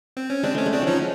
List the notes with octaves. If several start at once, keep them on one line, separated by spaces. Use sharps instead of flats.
C4
C#4
G#3 C4 D4
A3 C#4
G#3
C4 D4
F#3
F3 C#4 D#4